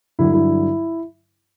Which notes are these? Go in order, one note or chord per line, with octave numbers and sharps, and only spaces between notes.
G2 D3 F#3 E4
E4